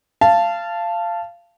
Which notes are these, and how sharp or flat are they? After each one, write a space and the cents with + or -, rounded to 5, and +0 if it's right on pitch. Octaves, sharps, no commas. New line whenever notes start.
F5 -20 A5 +0